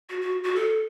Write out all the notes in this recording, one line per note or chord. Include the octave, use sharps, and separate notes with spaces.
F#4
F#4
F#4
A4